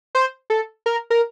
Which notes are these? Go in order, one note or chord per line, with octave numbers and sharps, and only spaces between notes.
C5
A4
A#4
A#4